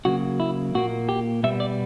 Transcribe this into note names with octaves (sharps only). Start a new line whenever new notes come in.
C#3 F#3 A#3 F#4
E4
A#2 A#3 F#4
G4
B2 G3 B3 E5
D5